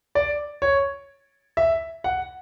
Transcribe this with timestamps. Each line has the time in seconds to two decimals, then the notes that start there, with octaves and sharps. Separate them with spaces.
0.15 D5
0.62 C#5
1.57 E5
2.04 F#5